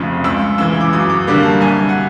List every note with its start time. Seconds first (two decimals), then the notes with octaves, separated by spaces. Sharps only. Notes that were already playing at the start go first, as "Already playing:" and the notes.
Already playing: F1 F2 C#3
0.24 C#2 E6
0.58 C#3 E3 E6
0.81 D6
0.93 F#2 D#6
1.10 D6
1.27 D3 G3 A#3
1.43 A5
1.61 C2 G#5
1.89 F#5